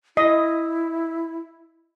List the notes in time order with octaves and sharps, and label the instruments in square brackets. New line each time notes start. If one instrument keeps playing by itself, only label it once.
[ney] E4 [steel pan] D#5